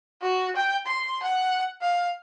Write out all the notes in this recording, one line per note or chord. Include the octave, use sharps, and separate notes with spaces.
F#4
G5
C6
F#5
F5